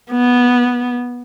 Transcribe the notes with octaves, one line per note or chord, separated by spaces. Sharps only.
B3